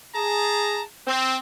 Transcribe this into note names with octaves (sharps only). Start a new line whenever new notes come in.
G#4 A5 A#5
C4